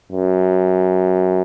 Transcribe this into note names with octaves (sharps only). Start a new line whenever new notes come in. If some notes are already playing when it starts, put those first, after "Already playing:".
F#2